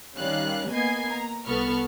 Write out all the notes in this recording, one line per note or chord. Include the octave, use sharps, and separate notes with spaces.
D#3 G3 C#4 F5 F#6
A#3 B3 D#5 G#5 G#6 C7
A#5
C2 B3 A4 B5 C#6 F6